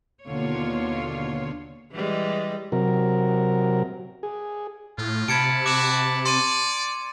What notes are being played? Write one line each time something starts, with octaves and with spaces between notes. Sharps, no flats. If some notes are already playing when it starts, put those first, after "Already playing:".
D#2 B2 D3 F4 C#5
E3 G3 G#3
C3 F#3 A#4
G#4
A2 F4
C3 A5 B5 G#6 C#7 D7
F#4 D6 E7
D5 C6 D#7